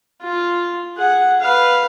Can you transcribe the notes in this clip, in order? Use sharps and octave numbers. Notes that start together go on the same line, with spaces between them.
F4
G#4 F#5
B4 F5